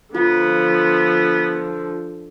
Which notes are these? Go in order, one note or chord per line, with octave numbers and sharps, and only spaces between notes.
D3 F3 B3 F4